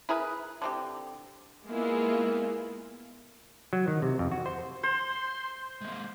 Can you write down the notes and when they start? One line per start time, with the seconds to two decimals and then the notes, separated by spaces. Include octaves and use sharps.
0.09 E4 G#4 A#4 B4
0.62 D3 C4 G4
1.68 G#3 A#3 B3 E4 F4 G#4
3.73 F#3
3.88 D#3
4.02 C3
4.19 F2
4.32 F#4
4.46 C5
4.83 C5 C6
5.81 G#3 A#3